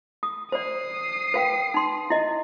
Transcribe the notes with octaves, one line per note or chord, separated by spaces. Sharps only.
D#6
C5 D5 D#6 C7
B4 F5 G5
D#4 C6
E4 D#5